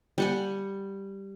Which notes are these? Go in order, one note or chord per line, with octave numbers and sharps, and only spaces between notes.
G3 F#5 G#5